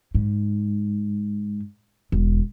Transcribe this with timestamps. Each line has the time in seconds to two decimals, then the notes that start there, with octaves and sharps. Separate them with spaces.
0.15 G#2
2.12 E1